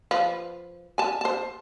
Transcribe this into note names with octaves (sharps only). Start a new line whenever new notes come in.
F3 B4
G#5 A5
C5 A5